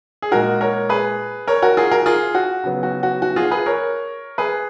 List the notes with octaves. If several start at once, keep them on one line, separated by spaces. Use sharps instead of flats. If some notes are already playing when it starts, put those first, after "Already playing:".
G#4
A#2 G#3 D#4 F#4 A#4
A#4 C#5
G#4 B4
A#4 C#5
F#4 A#4
F4 G#4
F#4 A#4
F4 G#4
F#4
C#3 F#3 B3
F#4
F#4
F#4
F4 G#4
G#4 B4
A#4 C#5
G#4 B4